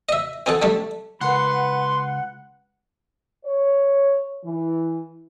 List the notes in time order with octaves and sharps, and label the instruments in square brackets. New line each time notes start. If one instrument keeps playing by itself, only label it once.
[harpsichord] D#5 E5
C4 D#4 G#4 A4 F#5
G3 A3 D4
[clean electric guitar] C#2 [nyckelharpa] B4 [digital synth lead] F#5 [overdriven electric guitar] C6
[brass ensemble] C#5
E3